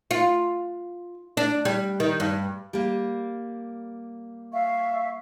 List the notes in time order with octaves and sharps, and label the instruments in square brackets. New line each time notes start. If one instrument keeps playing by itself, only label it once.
[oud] F4
D4
G3
D#3
G2
[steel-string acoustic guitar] G3 A#3
[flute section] E5 F5 C#6